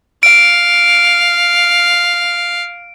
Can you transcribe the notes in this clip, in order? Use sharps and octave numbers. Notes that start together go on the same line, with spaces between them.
F5 D7